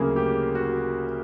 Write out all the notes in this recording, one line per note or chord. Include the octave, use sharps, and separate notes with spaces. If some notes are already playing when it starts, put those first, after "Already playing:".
Already playing: D2 C#3 F#3 A#3 G#4
G4
F#4